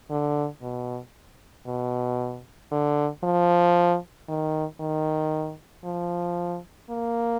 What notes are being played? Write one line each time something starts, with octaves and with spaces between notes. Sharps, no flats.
D3
B2
B2
D3
F3
D#3
D#3
F3
A#3